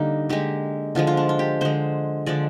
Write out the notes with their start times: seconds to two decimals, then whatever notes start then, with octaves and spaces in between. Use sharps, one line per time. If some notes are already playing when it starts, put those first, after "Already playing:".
Already playing: D3 G3 A#3 D#4
0.29 D3 G#3 G4
0.95 D3 F3 G#3 F4
1.07 F4
1.17 D4
1.29 F4
1.39 G4
1.61 D3 G#3 C5
2.26 D3 F3 G#3 D5